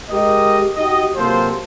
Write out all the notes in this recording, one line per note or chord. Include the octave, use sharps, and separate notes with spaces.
G#3 G4 A#4 D#5
D#4 F#4 G4 D#5
C3 F#3 A#3 F4 A4 C5